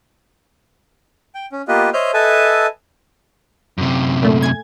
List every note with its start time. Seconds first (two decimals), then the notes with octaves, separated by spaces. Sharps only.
1.35 G5
1.52 C#4
1.68 A#3 B3 F4 G4 B4 D#5
1.93 C5 C#5 D#5 E5 F6 G6
2.14 A4 B4 D#5 E5 G#5 A5
3.78 F#2 C3
4.23 A#2 A3
4.43 G#5 G#6